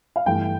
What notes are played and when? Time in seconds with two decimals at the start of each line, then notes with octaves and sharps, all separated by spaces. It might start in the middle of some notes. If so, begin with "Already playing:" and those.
0.16 F5
0.26 G1 G2 E3 A3 G5